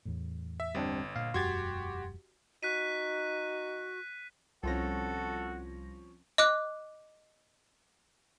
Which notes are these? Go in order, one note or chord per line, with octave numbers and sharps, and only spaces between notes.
E2 A2
E5
G1 G3 C4 D4
A#2 F5
E1 F#2 F#4 G4 C6 G#6 A6
D#4 F#4 F#6 B6 D#7
C2 F3 C4 C#4 F4 F#4 A4 A#6
D#5 D6 F#6